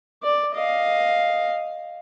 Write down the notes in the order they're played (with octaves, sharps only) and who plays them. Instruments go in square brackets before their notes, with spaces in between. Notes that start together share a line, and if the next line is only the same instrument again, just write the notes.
[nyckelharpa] D5
D#5 F5